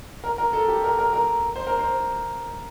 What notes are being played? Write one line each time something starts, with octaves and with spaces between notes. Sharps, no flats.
A#4
A#4
A4
G4
A#4
A#4
A#4
C5
A#4
C5